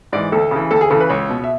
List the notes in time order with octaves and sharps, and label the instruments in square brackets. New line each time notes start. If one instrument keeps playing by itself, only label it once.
[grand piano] G#2 E3 D5
D2 A4
C#3 E3
D2 A4
G#4
C#3 E3 A4
B4
C#2 C#5
B2
E5